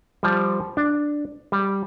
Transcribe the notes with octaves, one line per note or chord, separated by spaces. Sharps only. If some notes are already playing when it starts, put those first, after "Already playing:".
F3 G3
D4
G3